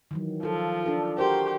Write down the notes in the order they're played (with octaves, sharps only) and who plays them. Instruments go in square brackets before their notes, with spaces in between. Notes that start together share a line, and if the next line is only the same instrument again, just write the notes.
[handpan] D#3 E3 F#3
[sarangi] F3 [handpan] F4 A4
[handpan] D4 A4
[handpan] F#4 A#4 C5 [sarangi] G4